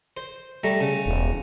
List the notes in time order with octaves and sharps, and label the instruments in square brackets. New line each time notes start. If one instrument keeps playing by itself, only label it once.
[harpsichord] C5
G3 A3 A#5
C#3
[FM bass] E1